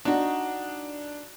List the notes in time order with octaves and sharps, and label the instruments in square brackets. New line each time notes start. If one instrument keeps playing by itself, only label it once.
[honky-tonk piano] D4 [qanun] D#4 F#4